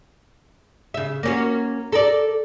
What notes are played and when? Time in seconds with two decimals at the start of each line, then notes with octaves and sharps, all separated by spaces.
0.94 C#3 E5
1.23 A#3 C#4 F#4
1.92 A4 A#4 D5